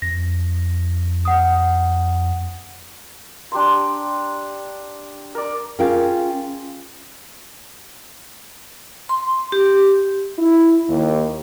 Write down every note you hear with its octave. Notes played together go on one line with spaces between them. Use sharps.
F2 A#6
F#5 D#6
D4 G4 A#5 C6
A#4 D5
C#4 F4 G#4 A#4 F5 G5
C6
G4
E4
D#2